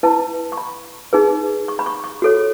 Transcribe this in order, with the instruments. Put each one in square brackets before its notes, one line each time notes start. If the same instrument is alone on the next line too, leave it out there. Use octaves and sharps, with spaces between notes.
[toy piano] E4 B4 A5
C#6
B5
D#4 G#4 B4
C#6
B5
C#6
C#6
F#4 A4 C#5